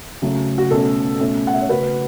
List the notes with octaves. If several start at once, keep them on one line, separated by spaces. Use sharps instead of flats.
C#3 F#3 A3 C#4
F#4
B2 A3 C#4 A4
B2 A3 C#4
F#5
E5
C#5
C#3 A3 C#4 F#4 B4